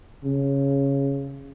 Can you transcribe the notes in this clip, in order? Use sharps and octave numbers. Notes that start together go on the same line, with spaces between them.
C#3